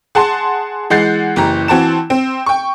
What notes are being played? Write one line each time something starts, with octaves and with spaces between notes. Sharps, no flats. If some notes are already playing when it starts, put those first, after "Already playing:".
G#4 F#5 A5 C6
E3 G#3 F#5 G6 A6 C7
F#1 E3 G4 A#5
E3 C4 F#4 A5 E7
C4
G5 C#6